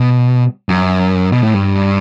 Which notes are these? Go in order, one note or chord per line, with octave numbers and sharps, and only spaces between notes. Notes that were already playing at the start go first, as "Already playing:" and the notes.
Already playing: B2
F#2
B2
A2
G2